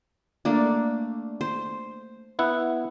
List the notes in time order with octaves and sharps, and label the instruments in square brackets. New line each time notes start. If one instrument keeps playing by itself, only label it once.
[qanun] A3 A#3 D4
C5
[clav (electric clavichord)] B3 E4 F#5